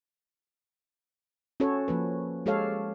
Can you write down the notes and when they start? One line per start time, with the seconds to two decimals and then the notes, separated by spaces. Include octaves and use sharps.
1.60 C#4 F#4 A4 C#5
1.88 F3 A#3 B4
2.46 G#3 G4 A4 C#5 F5